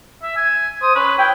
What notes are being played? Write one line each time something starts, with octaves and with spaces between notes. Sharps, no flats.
E5
G#5
C5 D#6
C#4 B4
E4 G5